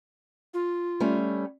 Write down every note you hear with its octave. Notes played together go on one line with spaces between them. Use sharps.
F4
G3 A3 C#4